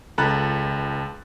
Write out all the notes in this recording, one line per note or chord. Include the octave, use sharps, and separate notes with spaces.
C#2 A4 A#5 B5 F#6 A6